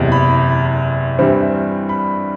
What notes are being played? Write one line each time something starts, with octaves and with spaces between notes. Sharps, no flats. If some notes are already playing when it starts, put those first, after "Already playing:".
Already playing: F#1 E2 C3
B5
G2 E3 G3 C4
B5